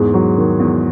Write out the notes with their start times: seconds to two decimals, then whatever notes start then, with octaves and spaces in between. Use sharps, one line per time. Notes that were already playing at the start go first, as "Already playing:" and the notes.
Already playing: E2 G#2 G#4
0.14 F#3
0.37 D#3
0.60 E2